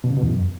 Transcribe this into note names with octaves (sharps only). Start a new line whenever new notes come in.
B2
C#3
B2
E2
F#2